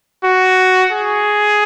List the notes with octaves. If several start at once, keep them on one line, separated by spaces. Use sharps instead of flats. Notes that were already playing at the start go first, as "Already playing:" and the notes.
F#4
G#4